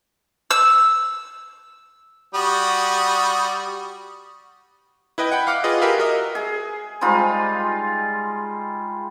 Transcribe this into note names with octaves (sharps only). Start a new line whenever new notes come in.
E6
G3 F#4 D#6
E4 B4 D#5 G5
F#5 G5 B5
F5 F#5 D6 F6 F#6
F4 G#4 B4 D#5
G4 G#4 A#4 B4 E5 F5
F#4 A#4 D#5 E5
G#4
G3 G#3 D#4 F4